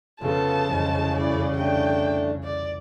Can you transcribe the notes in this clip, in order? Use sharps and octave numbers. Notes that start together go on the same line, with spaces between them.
F1 C#3 B3 F4 G#4 A4 A5
E1 C2 F2 G#3
F#2 A3 E4 D5
A3 D4 G4 G5
D5